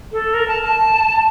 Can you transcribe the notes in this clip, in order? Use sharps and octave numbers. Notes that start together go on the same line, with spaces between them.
A4
A#4
A5
A5